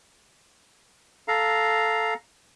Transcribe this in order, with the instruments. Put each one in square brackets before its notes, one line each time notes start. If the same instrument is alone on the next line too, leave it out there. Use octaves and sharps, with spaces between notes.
[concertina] A4 F5 A#5